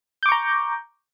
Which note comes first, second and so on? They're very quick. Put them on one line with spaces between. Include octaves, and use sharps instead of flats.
G6 D6 C#6 A#5